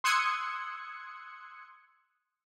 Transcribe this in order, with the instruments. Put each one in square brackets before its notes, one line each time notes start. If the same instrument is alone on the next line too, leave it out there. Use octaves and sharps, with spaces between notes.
[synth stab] C6 D#6 E6 F#6 G#6 C#7